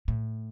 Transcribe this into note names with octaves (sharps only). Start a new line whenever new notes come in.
A2